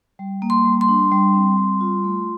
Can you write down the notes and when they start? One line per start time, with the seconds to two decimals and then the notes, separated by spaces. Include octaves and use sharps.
0.19 G3
0.42 A#3
0.50 C6
0.65 G3
0.81 C6
0.88 D4
1.12 G3
1.34 C4
1.57 G3
1.81 F4
2.04 A3